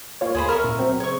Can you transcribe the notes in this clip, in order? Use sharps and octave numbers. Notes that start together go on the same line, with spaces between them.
A#3 F4 C#5
D2 G#4 C5 B5
A#4 E5 C#6 F6
C#2 A#2
F#3 C4
C#3 C4 C#5 C#6